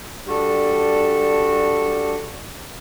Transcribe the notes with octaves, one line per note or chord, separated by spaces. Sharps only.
G3 D4 F#4 A4 D5